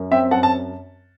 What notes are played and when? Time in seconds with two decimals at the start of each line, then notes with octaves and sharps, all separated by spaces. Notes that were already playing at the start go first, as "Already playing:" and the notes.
Already playing: F#2
0.11 C4 E5 G5
0.31 F#2 F#5 A5
0.43 A5